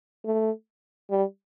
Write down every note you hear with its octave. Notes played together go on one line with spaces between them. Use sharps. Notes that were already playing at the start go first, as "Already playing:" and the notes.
A3
G3